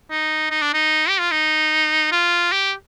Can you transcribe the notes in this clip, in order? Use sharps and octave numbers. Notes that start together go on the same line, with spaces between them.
D#4
D#4
D4
D#4
G4
F4
D#4
F4
G4